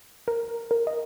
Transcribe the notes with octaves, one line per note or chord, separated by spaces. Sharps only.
A#4
A#4
D#5